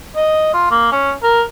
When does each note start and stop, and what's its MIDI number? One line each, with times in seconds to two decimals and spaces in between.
0.16 0.49 75
0.54 0.69 65
0.71 0.91 58
0.92 1.13 61
1.23 1.42 70